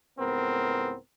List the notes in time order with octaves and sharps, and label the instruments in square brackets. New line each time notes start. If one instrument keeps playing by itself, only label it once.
[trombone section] C#2 A2 B3 C4 A#4